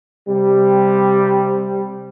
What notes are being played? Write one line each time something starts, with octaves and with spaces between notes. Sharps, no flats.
C3 G3